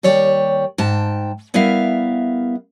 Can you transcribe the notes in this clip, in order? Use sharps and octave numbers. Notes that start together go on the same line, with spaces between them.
D#2 G3 C#5 D5 G5
G#2 G5 A5
G3 B3 E4 A#4 E5 F5